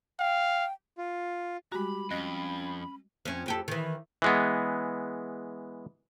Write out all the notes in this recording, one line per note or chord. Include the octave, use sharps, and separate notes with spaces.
F5 G5
F4
G3 G#3 F#4 G4 A#5 B5
F2 C#4 D#5 F#6 A#6
F2 C#4
F2 G4 A4
D#3 E3
E3 G#3 B3